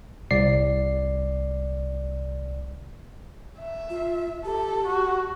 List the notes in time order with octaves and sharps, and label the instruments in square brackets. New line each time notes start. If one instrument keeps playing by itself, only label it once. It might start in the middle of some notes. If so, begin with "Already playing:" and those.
[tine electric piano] C2 D5 C7
[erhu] E5
[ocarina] F4
[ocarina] G4 [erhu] A4
[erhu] F#4